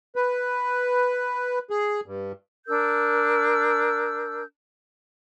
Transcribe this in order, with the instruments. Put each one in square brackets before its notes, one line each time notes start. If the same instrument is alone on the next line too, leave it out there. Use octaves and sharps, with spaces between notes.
[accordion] B4
G#4
G2
[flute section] D4 A#4 E6 G6